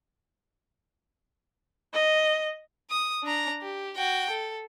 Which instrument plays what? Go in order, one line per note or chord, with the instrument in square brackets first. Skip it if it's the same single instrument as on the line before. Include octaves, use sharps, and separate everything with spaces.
[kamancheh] D#5
[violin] D#6
D4 A#5
G4
F#4 G5
A4